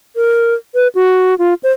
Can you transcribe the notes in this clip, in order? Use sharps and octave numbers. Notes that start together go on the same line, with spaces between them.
A#4
B4
F#4
F4
C5